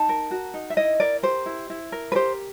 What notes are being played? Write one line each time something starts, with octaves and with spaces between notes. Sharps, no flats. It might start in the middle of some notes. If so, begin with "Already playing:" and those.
Already playing: D#4 A5
A#4
F#4
D#4
E5
E4 D#5
A#4 D5
G4 C5
E4
E4
A#4
B4
G4 C5